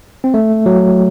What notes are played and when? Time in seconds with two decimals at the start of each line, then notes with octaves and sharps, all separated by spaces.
0.24 C4
0.34 A3
0.66 F#3